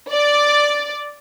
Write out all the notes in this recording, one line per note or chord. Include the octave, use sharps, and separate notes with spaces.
D5